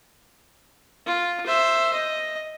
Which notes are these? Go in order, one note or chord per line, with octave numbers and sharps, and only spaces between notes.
F4
C5 E5
D#5